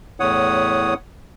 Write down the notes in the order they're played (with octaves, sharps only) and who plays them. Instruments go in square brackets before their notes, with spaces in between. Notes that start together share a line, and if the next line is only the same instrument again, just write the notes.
[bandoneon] E2 A2 C#5 F#5 D#6